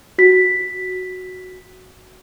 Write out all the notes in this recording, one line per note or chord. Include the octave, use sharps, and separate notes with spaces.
F#4 B6